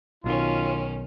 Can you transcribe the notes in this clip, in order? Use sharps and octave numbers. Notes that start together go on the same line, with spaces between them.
B1 B2 D#3 C#4 F4